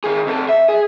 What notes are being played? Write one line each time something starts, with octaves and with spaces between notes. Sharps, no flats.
D#3 G#4
C3 A4
E5
G#4